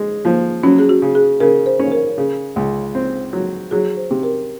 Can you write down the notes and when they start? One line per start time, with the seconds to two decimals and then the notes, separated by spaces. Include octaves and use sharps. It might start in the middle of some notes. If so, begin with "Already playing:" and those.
Already playing: G#3
0.25 F3 A#3
0.63 F#3 C#4
0.79 G#4
0.89 F#4
1.02 C#3
1.15 G#4
1.40 C#3 A#4
1.66 C5
1.79 C#4
1.92 A#4
2.18 C#3
2.56 C#2
2.95 C4
3.33 F#3
3.71 F#3 G#4
3.97 C5
4.11 C3
4.23 A#4